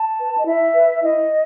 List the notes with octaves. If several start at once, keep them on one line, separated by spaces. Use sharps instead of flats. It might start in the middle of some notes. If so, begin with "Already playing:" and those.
Already playing: A5
B4
D#5
E4 E5
B4
E4 D#5